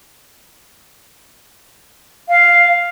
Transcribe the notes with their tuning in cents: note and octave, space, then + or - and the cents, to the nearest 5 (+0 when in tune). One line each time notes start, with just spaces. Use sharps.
F5 +0